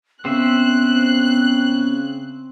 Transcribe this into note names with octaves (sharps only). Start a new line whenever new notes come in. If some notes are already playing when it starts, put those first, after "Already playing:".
C#3 B3 C4 C5 E5 F#6